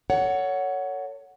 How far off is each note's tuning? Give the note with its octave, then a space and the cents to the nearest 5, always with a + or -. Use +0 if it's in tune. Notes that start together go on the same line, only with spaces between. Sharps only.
A4 +40 C#5 +20 F#5 +0